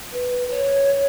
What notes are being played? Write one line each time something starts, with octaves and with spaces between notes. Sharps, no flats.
B4
C#5